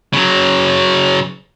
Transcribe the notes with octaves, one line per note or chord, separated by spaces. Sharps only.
C#3 F#3